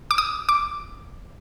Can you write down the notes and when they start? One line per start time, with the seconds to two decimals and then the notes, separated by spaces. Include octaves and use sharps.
0.11 D6
0.18 D#6
0.49 D6